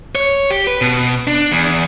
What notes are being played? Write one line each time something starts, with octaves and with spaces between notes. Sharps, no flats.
C#5
G4
B4
B2
D4
E2